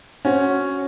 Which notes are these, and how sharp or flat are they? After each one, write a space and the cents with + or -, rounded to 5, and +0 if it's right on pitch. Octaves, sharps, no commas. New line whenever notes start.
C#4 +0 F#4 +0 C5 +10